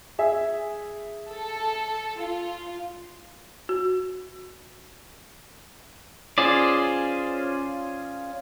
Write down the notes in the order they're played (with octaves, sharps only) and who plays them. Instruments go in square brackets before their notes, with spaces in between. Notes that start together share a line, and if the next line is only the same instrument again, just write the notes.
[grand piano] G#4 E5
[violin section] A4
F4
[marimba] F#4
[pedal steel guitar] C#4 F4 G#4 C5 D5